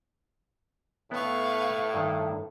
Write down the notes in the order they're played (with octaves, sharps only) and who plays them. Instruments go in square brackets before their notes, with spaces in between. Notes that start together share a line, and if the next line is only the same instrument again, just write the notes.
[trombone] A2 [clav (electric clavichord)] B3 E4 [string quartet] B4 F5 C#6
[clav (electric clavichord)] G2 D#3